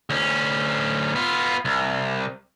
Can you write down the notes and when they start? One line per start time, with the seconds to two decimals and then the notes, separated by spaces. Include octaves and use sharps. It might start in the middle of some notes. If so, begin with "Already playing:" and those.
0.10 D2 C#4
1.15 B3 F4
1.65 C2